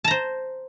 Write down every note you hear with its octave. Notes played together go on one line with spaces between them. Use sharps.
C5 A5 A#5